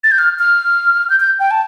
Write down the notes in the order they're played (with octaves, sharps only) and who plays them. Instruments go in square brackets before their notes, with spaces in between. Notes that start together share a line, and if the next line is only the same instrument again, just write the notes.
[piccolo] A6
G6
F6
F6
G6
G6
G5
A5